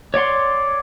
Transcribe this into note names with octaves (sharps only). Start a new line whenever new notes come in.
C#5 D5 F#5 C6